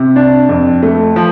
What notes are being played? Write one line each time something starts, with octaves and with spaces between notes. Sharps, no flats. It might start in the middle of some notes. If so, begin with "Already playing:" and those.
Already playing: C3
D4
F2
A3
F3